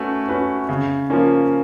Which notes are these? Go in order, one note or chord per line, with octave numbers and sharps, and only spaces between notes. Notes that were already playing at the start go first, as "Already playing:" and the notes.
Already playing: A3 C#4 F#4 B4
C#4 F#4 B4
C#3
F3 A#3 C#4